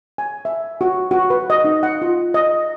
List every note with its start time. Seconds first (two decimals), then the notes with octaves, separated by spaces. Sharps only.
0.18 G#5
0.45 E5
0.81 F#4
1.11 F#4
1.30 B4
1.50 D#5
1.65 D#4
1.83 F#5
2.02 F4
2.34 D#5